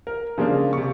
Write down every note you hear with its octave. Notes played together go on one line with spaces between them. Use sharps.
A#4
C#3 F3 G#3 A#3 D4
C3 C#6